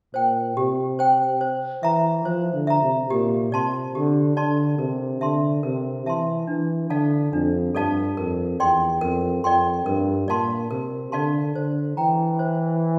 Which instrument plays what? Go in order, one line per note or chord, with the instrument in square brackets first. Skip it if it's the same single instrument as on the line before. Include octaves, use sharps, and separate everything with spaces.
[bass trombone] A#2 [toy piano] C5 G5
[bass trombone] C3 [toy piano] G4
[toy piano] C5 G5
C5
[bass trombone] E3 [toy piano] E5 A#5
[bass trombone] F3 [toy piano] C5
[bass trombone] D3
[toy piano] E5 A#5
[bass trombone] C3
[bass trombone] A#2 [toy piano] G4
[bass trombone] C3 [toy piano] D5 A5 C6
[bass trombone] D3 [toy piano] G4
[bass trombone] D3 [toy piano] D5 A5 C6
[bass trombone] C3 [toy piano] A#4
[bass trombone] D3 [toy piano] E5 A5 C6
[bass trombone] C3 [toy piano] A#4
[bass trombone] E3 [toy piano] E5 A5 C6
[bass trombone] E3 [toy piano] D4
[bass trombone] D3 [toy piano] A4 D5 F5 A5
[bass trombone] F2 [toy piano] D4
[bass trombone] G2 [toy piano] A4 D5 F5 A5
[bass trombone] F2 [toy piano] A#4
[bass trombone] E2 [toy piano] D5 G5 C6
[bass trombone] F2 [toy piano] A#4
[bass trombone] F2 [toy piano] D5 G5 C6
[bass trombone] G2 [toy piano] A#4
[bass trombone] A#2 [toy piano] D5 F5 A5 C6
[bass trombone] C3 [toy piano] A#4
[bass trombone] D3 [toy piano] D5 F5 A5 C6
[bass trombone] D3 [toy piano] C5
[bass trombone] E3 [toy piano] G5 A#5
[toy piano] C5